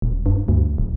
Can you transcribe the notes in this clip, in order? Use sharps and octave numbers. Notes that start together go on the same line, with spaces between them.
D#1
G2
D2
D1